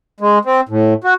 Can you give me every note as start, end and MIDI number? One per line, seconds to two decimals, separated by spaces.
0.20 0.38 56
0.45 0.61 60
0.69 0.94 45
1.04 1.14 66